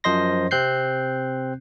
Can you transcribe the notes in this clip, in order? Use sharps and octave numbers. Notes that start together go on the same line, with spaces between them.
F#2 F3 C5 D#5 C6 A#6
C3 C4 F#6 G6 C7